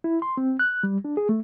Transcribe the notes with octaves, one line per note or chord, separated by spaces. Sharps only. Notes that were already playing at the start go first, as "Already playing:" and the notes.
E4
C6
C4
F#6
G3
D4
G#4
A3